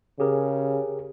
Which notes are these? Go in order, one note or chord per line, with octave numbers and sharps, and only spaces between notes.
C#3 G4 G#4 A#4